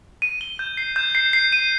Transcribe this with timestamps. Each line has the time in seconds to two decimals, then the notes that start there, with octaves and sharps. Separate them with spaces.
0.22 D#7
0.41 G7
0.59 G6
0.77 C7
0.96 G6
1.15 C7
1.33 C7
1.52 D#7